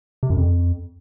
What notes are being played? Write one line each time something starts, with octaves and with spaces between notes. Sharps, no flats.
C3
F#2
F2